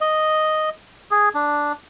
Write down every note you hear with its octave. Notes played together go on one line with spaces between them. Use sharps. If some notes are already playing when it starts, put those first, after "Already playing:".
D#5
G#4
D4